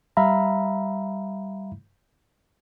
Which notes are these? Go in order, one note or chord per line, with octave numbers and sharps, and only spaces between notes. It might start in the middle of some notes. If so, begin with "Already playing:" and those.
G3 E5 F5 A#5 B5